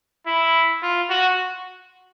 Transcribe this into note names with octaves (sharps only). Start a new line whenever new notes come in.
E4
F4
F#4